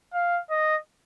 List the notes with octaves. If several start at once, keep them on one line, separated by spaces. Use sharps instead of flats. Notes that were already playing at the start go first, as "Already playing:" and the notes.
F5
D#5